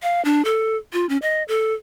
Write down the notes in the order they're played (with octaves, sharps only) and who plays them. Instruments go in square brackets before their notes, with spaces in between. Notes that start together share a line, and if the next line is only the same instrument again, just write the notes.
[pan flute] F5
D4
A4
F4
C#4
D#5
A4